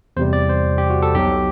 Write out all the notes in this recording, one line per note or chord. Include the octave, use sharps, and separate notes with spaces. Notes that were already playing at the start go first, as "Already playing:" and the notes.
E2 C3 G3 C5
D5
C5
G4
F#4
A4
B1 B2 F#3 G4